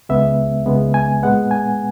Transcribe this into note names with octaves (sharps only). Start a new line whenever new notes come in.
C#2 C#3 G#3 B3 E5
C#2 C#3 G#3 B3
G#5
A#2 G#3 B3 F#5
G#5